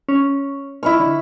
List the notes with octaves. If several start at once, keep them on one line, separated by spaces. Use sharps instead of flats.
C#4
E4 B5 C#6 F6
D3